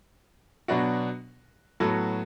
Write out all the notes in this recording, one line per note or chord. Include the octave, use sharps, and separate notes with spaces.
B2 F#3 B3 D4 F#4
A2 F#3 B3 F#4 A4